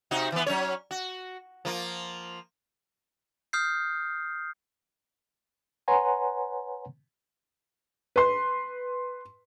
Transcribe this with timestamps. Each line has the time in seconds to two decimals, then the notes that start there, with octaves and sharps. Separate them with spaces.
0.11 C3 D#4 F#4
0.32 E3 B3
0.46 F#3 C#4 C#5
0.91 F#4
1.65 F3 A#3 F4
3.53 D#6 F6 G6 C7
5.88 B4 C#5 F#5 G#5 A#5 C6
8.16 B4 C6